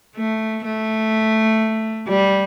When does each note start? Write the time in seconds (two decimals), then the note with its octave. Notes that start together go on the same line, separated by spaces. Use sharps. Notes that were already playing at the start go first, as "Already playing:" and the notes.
0.16 A3
0.65 A3
2.09 G3